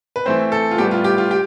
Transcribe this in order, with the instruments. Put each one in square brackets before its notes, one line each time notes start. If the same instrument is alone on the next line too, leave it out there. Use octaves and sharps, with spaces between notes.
[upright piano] B4
E3 A3 C4 C5
A4
F4
A2 G3 B3 G4
F4
G4
F4
G4